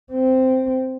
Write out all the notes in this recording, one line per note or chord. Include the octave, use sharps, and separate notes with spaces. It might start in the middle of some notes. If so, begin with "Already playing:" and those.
C4